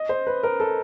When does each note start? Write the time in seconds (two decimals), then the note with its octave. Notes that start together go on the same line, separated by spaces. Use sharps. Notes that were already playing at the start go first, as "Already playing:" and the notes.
Already playing: D#5
0.09 C5
0.27 B4
0.43 A#4
0.60 A4